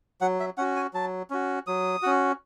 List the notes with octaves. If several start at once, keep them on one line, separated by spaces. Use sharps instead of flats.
F#3 F#5
E5
C#4 F#4 F#5
G#5
F#3 A5
C#4 F#4
F#3 D#6
C#4 F#4